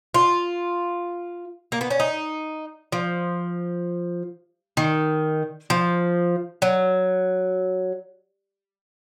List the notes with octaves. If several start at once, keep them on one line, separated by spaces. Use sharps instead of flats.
F4
A#3
B3
C#4
D#4
F3
D#3
F3
F#3